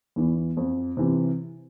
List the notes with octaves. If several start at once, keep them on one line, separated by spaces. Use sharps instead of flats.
E2 E3
F2
C3 E3